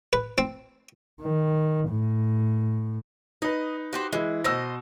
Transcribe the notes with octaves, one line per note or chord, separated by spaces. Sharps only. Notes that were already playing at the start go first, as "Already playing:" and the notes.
B4
C4
D#3
A2
D#4 B4 D#5
F#4 G4 C5
E3 G#3 E4
B2 C5 D#5 E6 A#6